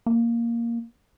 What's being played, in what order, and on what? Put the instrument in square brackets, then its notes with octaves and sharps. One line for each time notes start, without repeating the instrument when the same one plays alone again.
[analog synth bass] A#3